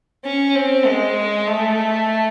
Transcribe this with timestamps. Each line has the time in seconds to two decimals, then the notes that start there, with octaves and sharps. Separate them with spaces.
0.25 C#4
0.55 C4
0.86 G#3
1.47 A3